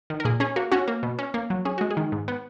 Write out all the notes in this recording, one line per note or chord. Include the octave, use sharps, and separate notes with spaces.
D#3
A#4
A#2 G#4
C#4 G#4
A#3 F#4
C#4 F#4
A#3
B2
C#4
A#3
F#3
C#4 G#4
G#3 F#4
G#4
D#3
G#2
B3